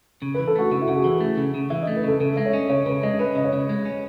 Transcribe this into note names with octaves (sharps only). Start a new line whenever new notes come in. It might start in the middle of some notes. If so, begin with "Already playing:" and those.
C#3
B4
E3
A4
A3 F#4
C#3 F#4
E4
C#3 F#4
G#4
E3
A3
C#3
C#3
E3 E5
D#5
A3
B4
C#3 A4
C#3 A4
G#3 E5
C#5
C#4 D#5
C#3 C#5
C#3 B4
G#3 D#5
C#4 B4
C#3 D#5
C#5
C#3
G#3
C#4